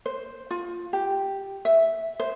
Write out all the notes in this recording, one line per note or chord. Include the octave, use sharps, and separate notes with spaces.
C5
F4
G4
E5
C5